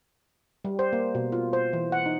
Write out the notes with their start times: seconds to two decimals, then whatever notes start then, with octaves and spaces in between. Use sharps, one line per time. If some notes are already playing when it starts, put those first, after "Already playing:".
0.65 G3
0.79 C5
0.93 A#3
1.15 B2
1.32 F4
1.53 C5
1.73 E3
1.92 F#5
2.06 D#4